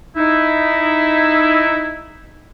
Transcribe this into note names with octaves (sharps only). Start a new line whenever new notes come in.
D#4 E4